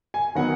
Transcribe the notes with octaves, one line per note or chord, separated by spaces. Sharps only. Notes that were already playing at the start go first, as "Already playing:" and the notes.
G#5
D#3 F#3 B3 F#5